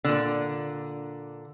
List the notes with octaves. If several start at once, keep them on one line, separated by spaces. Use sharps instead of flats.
A#2 D3